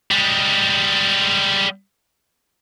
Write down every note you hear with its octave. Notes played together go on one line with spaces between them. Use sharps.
G3 G#3